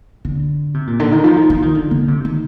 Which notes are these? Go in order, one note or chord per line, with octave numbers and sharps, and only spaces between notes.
D3
C3
A#2
D3
D#3
F3
D#3
F3
D#3
D3
D3
C3
D#3